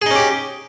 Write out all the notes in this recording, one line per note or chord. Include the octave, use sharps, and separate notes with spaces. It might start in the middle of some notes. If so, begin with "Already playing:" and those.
C#4 D#4 G4 G#4